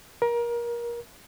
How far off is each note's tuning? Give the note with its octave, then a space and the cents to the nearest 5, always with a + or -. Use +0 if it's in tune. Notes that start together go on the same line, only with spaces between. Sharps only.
A#4 +25